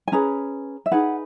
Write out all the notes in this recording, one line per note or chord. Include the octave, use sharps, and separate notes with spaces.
G#5
C#4 G#4 B4 A#5
E5
D#4 G#4 B4 F#5